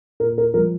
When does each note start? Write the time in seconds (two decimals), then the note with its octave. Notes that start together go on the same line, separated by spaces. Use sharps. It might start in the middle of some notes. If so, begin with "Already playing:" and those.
0.20 A#2 A#4
0.38 A#4
0.54 F3 A#4
0.58 G#3